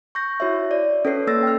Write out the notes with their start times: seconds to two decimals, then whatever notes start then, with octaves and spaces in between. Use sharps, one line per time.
0.15 C#6 G6 A#6
0.40 E4 F#4 C#5 E5
0.71 D5
1.05 C#4 A4 B4 C#5 C7
1.27 A#3 A4 E6 A6 A#6
1.43 G5 F6